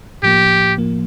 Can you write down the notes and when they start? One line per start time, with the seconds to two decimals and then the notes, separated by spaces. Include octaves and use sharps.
0.23 A2 F3 A#3 G4
0.78 A2 F3 A#3